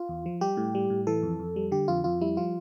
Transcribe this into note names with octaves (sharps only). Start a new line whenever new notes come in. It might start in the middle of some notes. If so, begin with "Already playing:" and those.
Already playing: F4
E2
F3
G3 G4
A2
G3
A2
E3 A4
F2
F2
G3
D3 G4
F2 F4
F2 F4
G3 E4
F3 F4